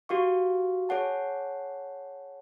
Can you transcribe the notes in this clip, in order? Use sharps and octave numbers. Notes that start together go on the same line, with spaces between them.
F#4 G4 F5 C#6
G#4 C#5 F#5 A5